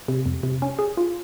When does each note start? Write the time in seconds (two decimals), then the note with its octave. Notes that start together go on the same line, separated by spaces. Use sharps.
0.08 C3
0.26 F2
0.43 C3
0.62 C#4
0.79 G#4
0.97 F4